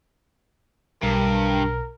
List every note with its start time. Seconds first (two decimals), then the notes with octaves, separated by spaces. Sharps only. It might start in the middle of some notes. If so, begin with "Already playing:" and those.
1.03 B1 G2 B2 A#4